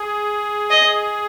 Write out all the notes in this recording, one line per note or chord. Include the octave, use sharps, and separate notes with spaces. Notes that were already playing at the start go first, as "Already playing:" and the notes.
Already playing: G#4
D#5